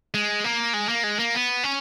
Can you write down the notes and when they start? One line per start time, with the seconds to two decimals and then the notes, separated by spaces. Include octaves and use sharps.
0.14 G#3
0.44 A#3
0.74 G#3
0.89 A#3
1.04 G#3
1.19 A#3
1.34 B3
1.64 C#4